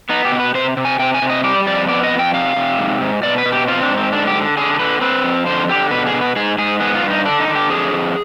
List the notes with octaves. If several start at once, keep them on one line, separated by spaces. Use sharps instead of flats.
B3 D#4
G4
B2
B4
C3 C5
C3
G#5
C3 G5
G#5
C3
D#5
G3 D5
F2 D5
B3 D5
D#5
F2
G5
C3 F5
C3
G#2
G#2
B2 D5
B4
B2
G4
C4 F4
D4
G#2
C4
D3 D4
G4
D3
D3 G#4
G#4
D3 B4
C4 B4
F2
D3 C5
D3 G4
B2 B4
G#4
B2
B4
G#2 G#4
G#2 G#4
B3 G#4
F4
G2
D#4
D3 D4
D#4
D3
G4
F2 G#4
F2